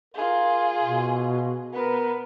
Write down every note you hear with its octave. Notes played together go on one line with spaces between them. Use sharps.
F4 G#4 A#4
B2
B3 A#4 B4